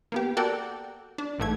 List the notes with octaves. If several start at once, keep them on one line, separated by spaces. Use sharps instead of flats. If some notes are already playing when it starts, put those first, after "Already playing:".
A#3 B3 G4
F#4 A4 A#4 D5 F#5 G5
D4
A1 G#2 A3 G#6